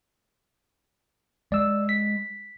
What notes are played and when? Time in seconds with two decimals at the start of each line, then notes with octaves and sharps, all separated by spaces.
1.52 G#3 D5 E6
1.89 B6